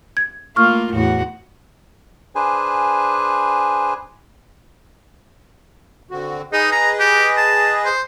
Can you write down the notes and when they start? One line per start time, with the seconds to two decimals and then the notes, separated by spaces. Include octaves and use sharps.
0.17 G#6
0.56 A3 A#3 F4 C#6 F6
0.93 E2 A2 F#4
2.35 D4 G#4 B4 C5 G#5
6.11 D3 C4 F#4
6.53 D#4 G#4 B4 D#5
6.72 A#5
7.00 G4
7.37 A5
7.85 C5